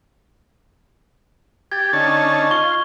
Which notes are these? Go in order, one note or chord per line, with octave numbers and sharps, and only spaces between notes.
G4 G#6 A6
D3 C#4 D#4 A5
F4 C#6 G7